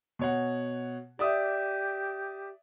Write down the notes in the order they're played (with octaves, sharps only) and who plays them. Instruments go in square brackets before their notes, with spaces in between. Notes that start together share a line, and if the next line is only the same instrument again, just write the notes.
[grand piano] B2 C#5 F#5
[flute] G4 [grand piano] D5 E5 D#6